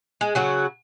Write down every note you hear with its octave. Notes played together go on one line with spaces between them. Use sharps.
G#3
C#3 F#3 F#4